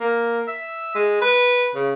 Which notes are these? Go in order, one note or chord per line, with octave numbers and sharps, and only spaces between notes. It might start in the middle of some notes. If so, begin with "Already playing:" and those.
A#3
E5
G#3
B4
C#3